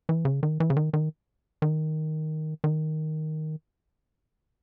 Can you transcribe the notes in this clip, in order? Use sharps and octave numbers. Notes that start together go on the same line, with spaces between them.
E3
C#3
D#3
E3
C#3
D#3
D#3
D#3
D#3